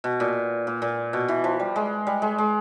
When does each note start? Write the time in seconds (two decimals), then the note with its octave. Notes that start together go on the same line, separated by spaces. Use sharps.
0.04 B2
0.20 A#2
0.67 A#2
0.82 A#2
1.13 B2
1.28 E3
1.44 F3
1.59 G3
1.76 G#3
2.07 G3
2.22 G#3
2.38 G#3